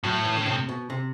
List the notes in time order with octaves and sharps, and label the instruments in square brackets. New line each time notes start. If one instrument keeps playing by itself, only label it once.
[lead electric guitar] A2 [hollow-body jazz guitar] F#3
[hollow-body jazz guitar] E3
D3
C3
B2
C3